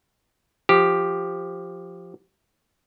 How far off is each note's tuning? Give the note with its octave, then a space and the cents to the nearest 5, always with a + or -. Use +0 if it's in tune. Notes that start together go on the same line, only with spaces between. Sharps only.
F3 +0 G4 +0